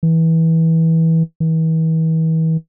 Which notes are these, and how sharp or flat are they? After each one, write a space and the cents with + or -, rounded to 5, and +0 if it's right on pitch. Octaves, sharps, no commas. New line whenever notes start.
E3 -20
E3 -40